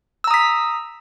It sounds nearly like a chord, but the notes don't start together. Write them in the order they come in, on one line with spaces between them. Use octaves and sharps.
E6 A#5 D#6 B6